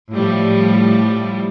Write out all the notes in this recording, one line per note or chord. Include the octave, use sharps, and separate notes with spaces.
A2 F3 G3